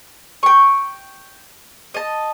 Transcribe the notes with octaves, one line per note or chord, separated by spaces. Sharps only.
G5 C#6
D#5 A5